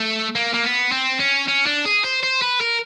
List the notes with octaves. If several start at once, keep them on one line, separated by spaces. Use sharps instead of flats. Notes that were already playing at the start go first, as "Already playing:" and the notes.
Already playing: A3
A#3
A#3
B3
C4
C#4
C#4
D4
G#4
C5
C5
B4
A#4